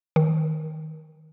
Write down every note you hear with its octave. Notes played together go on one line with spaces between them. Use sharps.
D#3